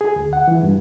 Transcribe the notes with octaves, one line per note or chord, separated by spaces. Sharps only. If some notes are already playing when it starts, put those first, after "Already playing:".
G#4
D2
F#5
E3
G2